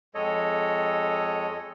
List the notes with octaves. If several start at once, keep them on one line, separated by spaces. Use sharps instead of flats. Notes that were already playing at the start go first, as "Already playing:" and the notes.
F2 G#3 A4 C#5 D#5